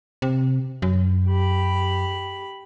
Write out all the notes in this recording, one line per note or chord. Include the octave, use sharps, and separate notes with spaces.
C3
F#2
G4 B5